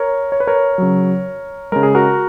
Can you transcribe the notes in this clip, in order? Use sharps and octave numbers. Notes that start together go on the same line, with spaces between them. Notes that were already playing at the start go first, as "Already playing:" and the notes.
Already playing: A#4 C#5
C#5
B4
A#4 C#5
C#3 F#3
C#3 G#3 A#4
G#4
F#4 A#4